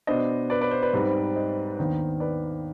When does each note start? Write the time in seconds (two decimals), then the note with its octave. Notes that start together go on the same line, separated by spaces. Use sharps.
0.07 B2 B3 D4 C5 D#5
0.50 B4 D5
0.61 B4 D5
0.71 C5
0.83 B4 D5
0.93 G#2 G3 C4 D#4
1.35 C5 D#5
1.78 D#2 D#3 B3 D4 C5
2.20 B4 D5